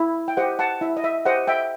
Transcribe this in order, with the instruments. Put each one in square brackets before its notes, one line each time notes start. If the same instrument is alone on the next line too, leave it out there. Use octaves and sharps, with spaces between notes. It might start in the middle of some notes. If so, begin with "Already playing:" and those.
Already playing: [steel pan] E4
G5
G4 C5 D#5 F#5
F#5 A5
E4 E5
D#5
E5
G4 C5 D#5 F#5
E5 G5